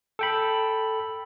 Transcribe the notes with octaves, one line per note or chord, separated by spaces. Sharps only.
A4 G5 B5